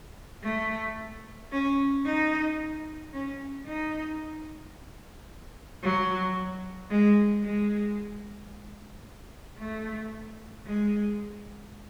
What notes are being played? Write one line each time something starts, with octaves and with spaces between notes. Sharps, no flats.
A3
C#4
D#4
C#4
D#4
F#3
G#3
G#3
A3
G#3